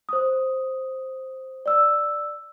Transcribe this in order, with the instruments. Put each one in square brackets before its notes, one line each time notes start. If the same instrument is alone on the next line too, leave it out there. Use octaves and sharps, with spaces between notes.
[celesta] C5 D#6
D5 E6